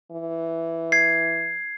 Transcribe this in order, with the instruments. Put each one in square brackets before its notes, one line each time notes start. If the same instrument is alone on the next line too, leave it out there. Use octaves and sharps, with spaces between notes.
[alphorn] E3
[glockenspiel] G#6 C7